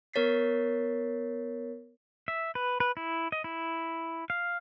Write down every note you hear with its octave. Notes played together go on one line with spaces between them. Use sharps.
B3 A#4 C#5 A6 B6 C7
E5
B4
B4
E4
D#5
E4
F5